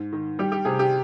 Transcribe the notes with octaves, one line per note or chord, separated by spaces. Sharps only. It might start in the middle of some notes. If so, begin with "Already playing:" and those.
Already playing: G#2
D#3
G3 G4
G4
C3 G#4
G4